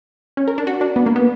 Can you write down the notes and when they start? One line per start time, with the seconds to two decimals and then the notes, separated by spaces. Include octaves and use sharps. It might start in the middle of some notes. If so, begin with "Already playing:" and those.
0.37 C#4
0.48 A#4
0.58 D4
0.67 F#4
0.81 D4
0.96 B3
1.06 A#3
1.16 B3